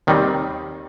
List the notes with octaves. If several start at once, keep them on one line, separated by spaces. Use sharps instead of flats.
D#2 D#3 G3 C4 D#4